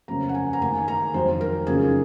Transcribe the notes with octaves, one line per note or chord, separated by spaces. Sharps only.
F2 C#3 F#3 A#3 C#4 A#5
F#5
G#5
A#5
D#3 A#3 D#4 G#5
A#5
F2 D#3 F#3 C5
A#4
F#2 C#3 F3 A#3 D#4 G#4